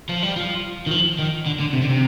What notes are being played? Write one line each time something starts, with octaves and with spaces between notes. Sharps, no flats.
F3
G3
F3
D#3
F3
D#3
D3
D3
C3
D3
C3